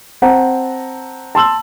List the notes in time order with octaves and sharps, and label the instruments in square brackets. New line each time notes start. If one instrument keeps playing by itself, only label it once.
[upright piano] C4 F#5 A5 A#5
A5 C6 E6 F#7